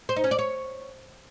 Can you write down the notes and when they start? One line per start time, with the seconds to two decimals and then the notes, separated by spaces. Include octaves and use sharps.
0.09 C5
0.16 D#4
0.24 C#4
0.31 D5
0.39 C#5